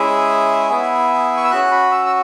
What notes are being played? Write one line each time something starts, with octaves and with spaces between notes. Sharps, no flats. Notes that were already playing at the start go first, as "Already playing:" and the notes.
Already playing: G#3 C#4 E4 G#4 E5
B3 E4 G#4
C#6
E6
C#4 F#4 F#6
B5
E6
E6